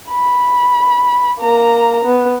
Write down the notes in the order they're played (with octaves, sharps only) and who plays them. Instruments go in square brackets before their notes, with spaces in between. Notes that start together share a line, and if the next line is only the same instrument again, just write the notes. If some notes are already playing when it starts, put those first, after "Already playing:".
[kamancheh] B5
A#3 A#5
B3